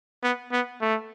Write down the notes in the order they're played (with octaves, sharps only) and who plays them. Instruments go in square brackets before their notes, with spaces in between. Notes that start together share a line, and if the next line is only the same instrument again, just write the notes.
[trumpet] B3
B3
A3